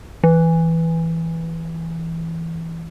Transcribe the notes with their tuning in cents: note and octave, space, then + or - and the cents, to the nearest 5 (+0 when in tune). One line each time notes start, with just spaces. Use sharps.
E3 +0